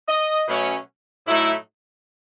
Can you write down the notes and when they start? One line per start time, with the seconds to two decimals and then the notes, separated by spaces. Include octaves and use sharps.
0.08 D#5
0.48 B2 F#3 A3 C#4
1.27 A2 F#3 A3 D#4 E4